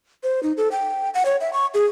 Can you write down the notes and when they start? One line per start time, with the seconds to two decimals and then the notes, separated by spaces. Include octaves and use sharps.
0.23 C5
0.43 D#4
0.57 A4
0.72 G5
1.14 F#5
1.26 C#5
1.41 E5
1.53 C#6
1.74 G#4